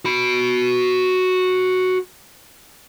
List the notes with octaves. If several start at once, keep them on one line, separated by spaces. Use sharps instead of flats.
F#4 B5